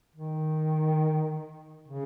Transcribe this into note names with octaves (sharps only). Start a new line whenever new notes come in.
D#3
C#3